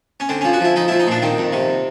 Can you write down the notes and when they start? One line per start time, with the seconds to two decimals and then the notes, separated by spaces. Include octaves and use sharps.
0.20 C#4
0.29 D3 C4
0.41 C#4
0.45 F3
0.53 F#4
0.60 F3 E4
0.76 F3 D#4
0.88 E4
0.91 F3
1.00 D#4
1.07 A#2 D4
1.22 D#3 C4
1.38 F2
1.53 C3